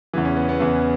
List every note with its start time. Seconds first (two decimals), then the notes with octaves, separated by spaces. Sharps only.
0.14 E2 C#3 E3
0.25 C#4
0.36 B3
0.49 B3
0.60 E2 C#3 E3